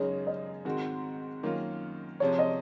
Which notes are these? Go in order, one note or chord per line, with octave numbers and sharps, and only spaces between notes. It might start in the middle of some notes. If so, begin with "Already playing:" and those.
Already playing: F#2 C#3 G#3 D#4 C#5
D#5
G#2 D#3 G#3 C4 F#4
F#2 D#3 A#3 C#4 F4
C3 F3 G#3 C#5
D#5